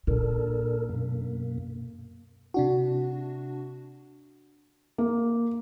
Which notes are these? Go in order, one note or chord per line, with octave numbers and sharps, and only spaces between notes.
A#2 D4 A4 A#4
F#2 B2 A#3
C3 D4 F#4
A#3